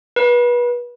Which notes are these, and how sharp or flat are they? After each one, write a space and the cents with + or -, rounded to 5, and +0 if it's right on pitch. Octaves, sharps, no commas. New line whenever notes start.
B4 -30